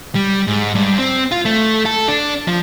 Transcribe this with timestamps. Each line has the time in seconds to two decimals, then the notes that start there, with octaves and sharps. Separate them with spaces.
0.15 G3
0.47 G#2
0.75 G2
0.99 C4
1.31 F4
1.45 A3
1.86 A4
2.08 D4
2.48 F3